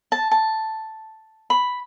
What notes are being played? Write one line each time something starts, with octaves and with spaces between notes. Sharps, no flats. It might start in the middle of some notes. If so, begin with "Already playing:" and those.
A5
A5
B5